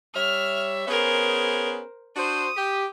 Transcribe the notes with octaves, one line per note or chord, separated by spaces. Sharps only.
G3 C#5 E5 F6
B3 C#4 G#4 A#4 C5
D4 F#4 C5 D#6
G4